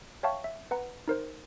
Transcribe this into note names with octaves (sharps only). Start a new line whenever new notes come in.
C#5 E5 F5 G5 A5 C#6
E5
B4 F#5 A#5
D#4 A#4 C5